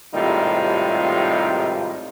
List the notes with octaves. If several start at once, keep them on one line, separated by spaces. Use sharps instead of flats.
G#1 A2 C3 G3 D#4 F4